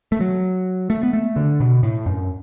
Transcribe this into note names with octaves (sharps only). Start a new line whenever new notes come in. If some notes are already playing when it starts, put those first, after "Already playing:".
A3
F#3
A3
B3
A3
D3
B2
A2
F#2